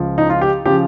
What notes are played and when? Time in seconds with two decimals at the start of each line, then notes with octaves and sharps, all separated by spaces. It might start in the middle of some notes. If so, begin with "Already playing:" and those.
Already playing: C#2 C#3 F3
0.18 D#4
0.30 F4
0.41 G4
0.65 C#3 F3 G4